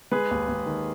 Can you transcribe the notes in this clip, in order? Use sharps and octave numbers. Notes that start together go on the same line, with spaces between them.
G#3 G#4 B4
D#2
D#2
D#3